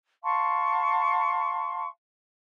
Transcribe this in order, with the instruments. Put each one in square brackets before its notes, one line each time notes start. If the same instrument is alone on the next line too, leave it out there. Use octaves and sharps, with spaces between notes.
[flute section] F5 A5 C6 C#6